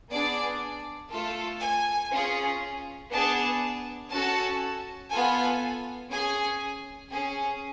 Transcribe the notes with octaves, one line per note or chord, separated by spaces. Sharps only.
B3 D4 G#4 D5
A3 F4 A4
G#5
C#4 F4 G#4
B3 D4 G#4 A5
C#4 F#4 A4 A5
B3 F4 A4 G#5
C#4 G#4 G#5
C#4 G#4